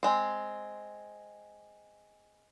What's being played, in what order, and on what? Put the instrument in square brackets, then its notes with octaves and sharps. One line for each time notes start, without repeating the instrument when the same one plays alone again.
[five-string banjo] G#3 C4